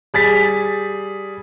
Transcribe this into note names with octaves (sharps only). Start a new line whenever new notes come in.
G3 G#4 A6 B6